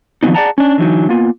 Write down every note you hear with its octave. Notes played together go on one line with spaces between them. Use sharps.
D#3 F3 F#3 B3 C4 D#4
G#4 D5 D#5 F#5 A5 A#5
C#4 D4
D3 E3 F#3 D#4
A#3 B3 F4